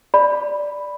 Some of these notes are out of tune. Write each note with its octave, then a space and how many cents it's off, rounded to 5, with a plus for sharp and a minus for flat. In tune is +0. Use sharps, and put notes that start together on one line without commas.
D5 +0 B5 +0